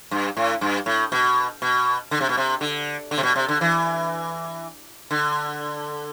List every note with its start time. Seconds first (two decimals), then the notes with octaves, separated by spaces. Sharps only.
0.11 G2
0.37 A2
0.61 G2
0.86 A2
1.12 B2
1.62 B2
2.11 D3
2.21 C3
2.29 B2
2.37 C3
2.61 D3
3.11 D3
3.18 C3
3.23 B2
3.36 C3
3.49 D3
3.61 E3
5.11 D3